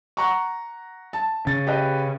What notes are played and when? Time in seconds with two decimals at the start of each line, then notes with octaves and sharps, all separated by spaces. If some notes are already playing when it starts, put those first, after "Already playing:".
0.17 F#5 A#5 C#6
1.13 A5
1.47 C#3 A6
1.67 G4 B4 D#5